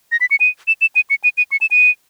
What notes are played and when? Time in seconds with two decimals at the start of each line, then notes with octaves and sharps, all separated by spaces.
0.12 A#6
0.21 B6
0.31 C#7
0.40 D#7
0.68 E7
0.81 E7
0.96 D#7
1.10 C#7
1.24 D#7
1.38 D#7
1.52 C#7
1.61 E7
1.71 D#7